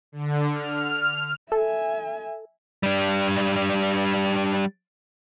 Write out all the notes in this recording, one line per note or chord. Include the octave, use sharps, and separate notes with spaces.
D3
F6
A4 E5 G#5
G3 D4